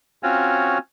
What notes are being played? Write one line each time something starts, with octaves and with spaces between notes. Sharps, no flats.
C4 C#4 F4 F#4 C#5